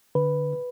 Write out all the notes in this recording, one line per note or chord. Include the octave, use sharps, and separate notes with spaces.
D3 B4